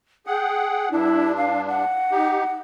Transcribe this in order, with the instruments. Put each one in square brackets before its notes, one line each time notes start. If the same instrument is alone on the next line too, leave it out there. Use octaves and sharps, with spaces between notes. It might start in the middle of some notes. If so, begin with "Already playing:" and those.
[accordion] G#4 F#5 [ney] G5
[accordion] G2 D4 [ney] E4
[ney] F5
F#5
[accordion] D#4 G4